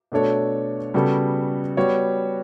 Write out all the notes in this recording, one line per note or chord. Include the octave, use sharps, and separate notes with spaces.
B2 A3 D4 A4 C#5
C#3 G3 B3 F#4 A4
G3 B3 F#4 C#5